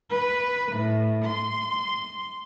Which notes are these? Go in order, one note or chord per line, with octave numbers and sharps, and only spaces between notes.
B4
A2
C6